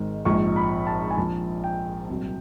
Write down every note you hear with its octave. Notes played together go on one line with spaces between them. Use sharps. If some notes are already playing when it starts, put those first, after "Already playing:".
Already playing: G#1 G#2 D#3 G#3
A#1 G#2 F3 G#3 C#6
B5
A5
G#5
A#1 A#2 F3 A5
G5
C2 A#2 F#3